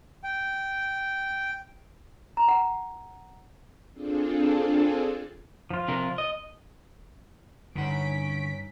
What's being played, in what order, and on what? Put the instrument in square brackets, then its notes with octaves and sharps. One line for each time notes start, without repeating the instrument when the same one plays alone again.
[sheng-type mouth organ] G5
[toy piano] A#5
F#5
[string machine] C4 D4 F4 G#4 A4
[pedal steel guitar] F3 F4
[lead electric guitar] C3 A#4
D#5
[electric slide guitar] G2 D#4 F#5 [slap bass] D3 [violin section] C#4 B6 D7